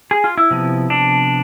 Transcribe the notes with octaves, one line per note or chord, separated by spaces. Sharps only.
G#4
F4
E4
C3 F3 B3
D4